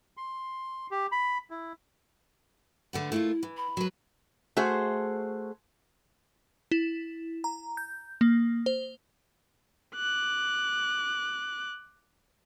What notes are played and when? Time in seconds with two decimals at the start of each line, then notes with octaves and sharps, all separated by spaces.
0.17 C6
0.91 G4
1.12 B5
1.51 E4
2.93 D3 A3 B3
3.12 A3 A#3 E4 F4
3.43 E3
3.57 B5
3.77 F#3 B4
4.57 A3 F#4 G#4 C5
6.71 E4
7.44 A#5
7.77 G6
8.21 A#3
8.66 C5
9.96 D6 F#6